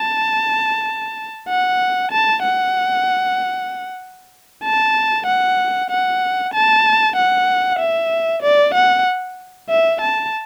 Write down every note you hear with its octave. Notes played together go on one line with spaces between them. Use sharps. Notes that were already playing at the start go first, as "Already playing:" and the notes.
Already playing: A5
F#5
A5
F#5
A5
F#5
F#5
A5
F#5
E5
D5
F#5
E5
A5